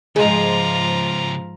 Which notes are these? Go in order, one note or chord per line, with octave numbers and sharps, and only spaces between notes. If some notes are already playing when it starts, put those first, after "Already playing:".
G#2 C#3 F3 G#3 F4 C5 A#5